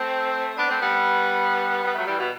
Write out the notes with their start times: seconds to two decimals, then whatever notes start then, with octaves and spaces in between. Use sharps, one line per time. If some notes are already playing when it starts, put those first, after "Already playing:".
Already playing: A3 C4
0.57 B3 D4
0.69 A3 C4
0.80 G3 B3
1.83 G3 B3
1.95 F#3 A3
2.06 E3 G3
2.18 B2